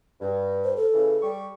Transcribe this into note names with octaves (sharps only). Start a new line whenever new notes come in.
G2
C5
A4
C#3 E3
G3 C#6